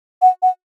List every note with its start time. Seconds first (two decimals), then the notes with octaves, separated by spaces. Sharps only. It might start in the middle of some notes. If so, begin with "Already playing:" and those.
0.22 F#5
0.42 F#5